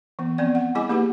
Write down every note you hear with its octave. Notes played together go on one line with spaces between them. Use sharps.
E3 B3
F3 B3 C4 D5
F#5
G3 E4 G#4 D#5 G#5 D6
A#3 D#4 G4 G#4 B4 F#5